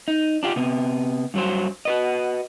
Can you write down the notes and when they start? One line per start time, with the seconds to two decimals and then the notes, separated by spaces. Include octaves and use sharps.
0.08 D#4
0.43 D4 F4 G4
0.56 C3 B3
1.34 G2 F#3 C5
1.85 F#4 B4 D#5